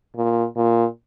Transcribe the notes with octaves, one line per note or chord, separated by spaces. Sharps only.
A#2
A#2